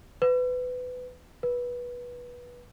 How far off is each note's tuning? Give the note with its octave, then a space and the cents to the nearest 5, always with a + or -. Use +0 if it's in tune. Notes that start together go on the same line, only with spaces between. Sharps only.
B4 +20
B4 -20